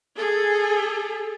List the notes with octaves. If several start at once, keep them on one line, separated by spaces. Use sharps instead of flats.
G#4 A4